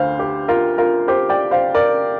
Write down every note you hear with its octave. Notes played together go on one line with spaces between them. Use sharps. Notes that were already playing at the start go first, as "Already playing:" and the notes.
Already playing: D2 D3 C5 F5
G4
F4 A#4
F4 A#4
G4 C5
D5 G5
C5 F5
A#4 D5